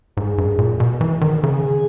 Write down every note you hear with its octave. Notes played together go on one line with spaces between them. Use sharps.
G#2 G#4
G2
A#2
B2
E3
D#3
C#3 G#4